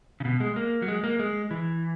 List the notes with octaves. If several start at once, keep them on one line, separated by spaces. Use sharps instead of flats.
C#3
B2
G#3
A#3
F#3
G#3
A#3
G#3
E3